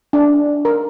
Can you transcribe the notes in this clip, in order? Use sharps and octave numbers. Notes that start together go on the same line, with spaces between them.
D4
A#4